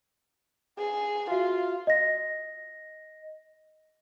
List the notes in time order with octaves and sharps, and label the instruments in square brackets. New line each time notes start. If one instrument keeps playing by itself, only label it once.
[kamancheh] G#4
[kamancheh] F4 [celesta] F#4 E5 F5
[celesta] D#5 A#6